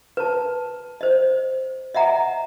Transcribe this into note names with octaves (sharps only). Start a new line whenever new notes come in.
B4 A5
C5 D#5
D#5 E5 F#5 A#5